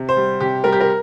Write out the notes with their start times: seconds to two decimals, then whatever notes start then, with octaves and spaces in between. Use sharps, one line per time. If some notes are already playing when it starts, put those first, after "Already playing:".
Already playing: C3
0.09 C5
0.17 G3
0.40 C3 G4
0.64 G3 A#4
0.72 G4
0.81 A#4